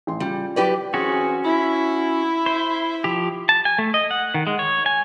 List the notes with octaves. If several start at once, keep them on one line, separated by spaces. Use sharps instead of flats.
A1 C6
C#3 G3 F4
F#3 E4 G4 B4 D5
E3 C4 C#4 F#4 G#4
E4
C5
F3 G4
A5
G#5
A3
D#5
F#5
D#3
G#3
C#5
G#5